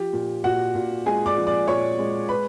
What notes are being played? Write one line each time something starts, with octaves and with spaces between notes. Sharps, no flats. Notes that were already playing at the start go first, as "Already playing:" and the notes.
Already playing: F3 G4
A#2
A#2 F#4 F#5
A#2
G#3 G#4 G#5
D5 D6
F3
D5 D6
A#2 C#5 C#6
G#3
B4 B5